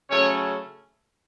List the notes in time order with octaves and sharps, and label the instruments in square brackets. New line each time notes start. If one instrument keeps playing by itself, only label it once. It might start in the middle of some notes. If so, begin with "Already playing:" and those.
[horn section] C#3 F#3 A3 C#4 C#5